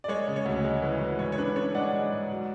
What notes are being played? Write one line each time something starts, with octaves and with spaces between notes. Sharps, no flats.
D5
G#3 C#5
C#3
C#5
D2
G#3
E3
E3
G#2 C#5
C#5
D4 B4
D4 C#5
G#3 D5 F#5
G#3
G#2
F#3